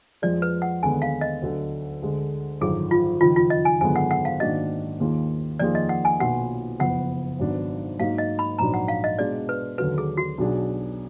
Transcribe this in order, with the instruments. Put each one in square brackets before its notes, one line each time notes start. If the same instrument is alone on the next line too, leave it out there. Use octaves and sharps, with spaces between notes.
[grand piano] F2 F3 G#3 [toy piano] D5
[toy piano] B4
F#5
[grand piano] D#2 D3 G#3 B3 [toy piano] G#5
[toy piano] F5
D#5
[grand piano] D2 D3 F#3
D2 D3 G#3
[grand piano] G#1 F#2 D3 F3 [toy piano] G#4
[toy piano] F4
[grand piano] F#1 F2 D#3 [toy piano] F4
[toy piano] F4
D#5
G#5
[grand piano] G#1 F#2 D3 G#3 B3 [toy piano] G#5
[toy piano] F#5
F#5
F5
[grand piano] G#2 D#3 A#3 D4 F#4 [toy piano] D#5
[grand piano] D#2 D#3 A#3 F4 G#4
[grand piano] F2 D#3 A#3 F4 G#4 [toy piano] D5
[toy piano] D#5
F#5
G#5
[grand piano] B1 A#2 F#3 B3 F4 [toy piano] F#5
[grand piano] F#1 F2 F3 B3 [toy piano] F#5
[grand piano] G#1 G#2 F#3 B3 D4
[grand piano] G#2 F#3 A#3 D#4 [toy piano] F5
[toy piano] D#5
B5
[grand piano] A#1 G#2 F#3 D4 [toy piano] A#5
[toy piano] F#5
F5
D#5
[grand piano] B2 G#3 D4 [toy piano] D5
[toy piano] B4
[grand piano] D#2 D3 F#3 [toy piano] B4
[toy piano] G#4
F#4
[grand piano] B1 B2 F#3 D4 G#4